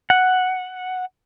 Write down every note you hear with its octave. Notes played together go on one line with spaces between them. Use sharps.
F#5